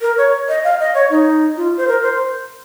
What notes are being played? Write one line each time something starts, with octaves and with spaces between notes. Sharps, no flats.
A#4
C#5
D#5
F5
D#5
C#5
D#4
F4
C5
A#4
C5